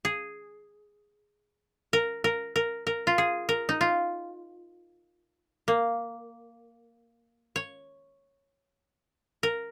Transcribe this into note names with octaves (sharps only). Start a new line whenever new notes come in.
G#4
A#4
A#4
A#4
A#4
F4
G#4
A#4
D#4
F4
A#3
C#5
A#4